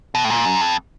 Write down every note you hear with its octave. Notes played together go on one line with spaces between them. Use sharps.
B2
A2
A#2
F#2
F2